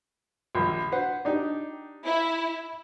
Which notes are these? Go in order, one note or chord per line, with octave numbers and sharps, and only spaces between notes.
A#1 D#2
B4 C5 F#5
D4 D#4 G4
E4